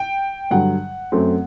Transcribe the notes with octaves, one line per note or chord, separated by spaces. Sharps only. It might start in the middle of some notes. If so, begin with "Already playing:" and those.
Already playing: G5
G2 D3 F#3 F#5
F#2 F#3 A3 C4